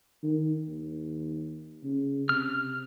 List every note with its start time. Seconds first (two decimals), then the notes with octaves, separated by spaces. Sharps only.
0.23 D#3
0.68 D#2
1.84 C#3
2.29 C3 F6